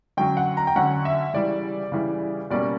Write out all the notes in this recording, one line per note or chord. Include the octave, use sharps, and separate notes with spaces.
D3 F#3 C#4 G5
F#5
A#5
G5
D3 F#3 C#4 F#5
E5
C#3 E3 G3 D5
C#3 E3 G3
B2 G3 A#3 C#4 D5